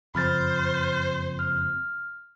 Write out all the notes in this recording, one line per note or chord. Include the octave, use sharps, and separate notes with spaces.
F#1 F2 C5 B5 F6 A6
F6